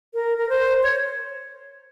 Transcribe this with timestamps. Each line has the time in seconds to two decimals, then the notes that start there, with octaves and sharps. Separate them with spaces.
0.14 A#4
0.38 A#4
0.49 C5
0.83 C#5